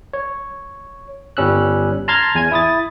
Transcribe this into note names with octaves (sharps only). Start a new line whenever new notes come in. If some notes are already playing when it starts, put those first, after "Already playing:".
C#5
G1 G3 C#4 E6 F#6
A5 A#5 C6 F6 G#6 A6
E2 G#5 G#6
E4 D#6 A6